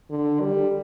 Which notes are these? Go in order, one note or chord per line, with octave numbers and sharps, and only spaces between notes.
D3
G3